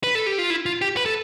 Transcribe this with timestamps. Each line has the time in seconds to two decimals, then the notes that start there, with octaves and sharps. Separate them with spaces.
0.03 B4
0.15 A4
0.27 G4
0.38 F4
0.50 E4
0.66 F4
0.81 G4
0.97 B4
1.06 A4